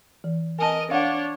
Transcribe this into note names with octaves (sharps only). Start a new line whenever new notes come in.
E3
A#4 D#5 G#5 A5
D4 C#5 F5 F#5